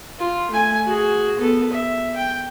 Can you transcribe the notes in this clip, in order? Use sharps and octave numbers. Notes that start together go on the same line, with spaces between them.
F4
A3 G#5
F#4 G#4
B3 A4
E5
G5